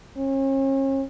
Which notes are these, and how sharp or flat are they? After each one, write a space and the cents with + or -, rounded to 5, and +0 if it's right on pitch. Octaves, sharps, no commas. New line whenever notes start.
C#4 -40